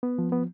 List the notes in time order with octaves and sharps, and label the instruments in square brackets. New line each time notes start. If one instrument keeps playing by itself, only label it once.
[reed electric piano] B3
F3
B3